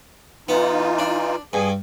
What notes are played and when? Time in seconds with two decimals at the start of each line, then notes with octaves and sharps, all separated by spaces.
0.49 E3 B3 D#4 F4
0.99 D4
1.53 G2 G#4 G#5